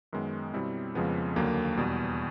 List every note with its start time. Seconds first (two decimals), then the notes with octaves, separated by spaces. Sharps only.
0.13 F#2 D#3 G#3 B3
0.54 B2 G3 C4 E4
0.95 F2 C#3 F3 G#3 B3
1.36 D#2 D3 F#3 A#3
1.77 E2 B2 G3